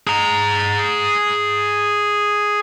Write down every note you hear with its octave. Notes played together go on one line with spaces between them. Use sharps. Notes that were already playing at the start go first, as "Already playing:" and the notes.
G#4 A#5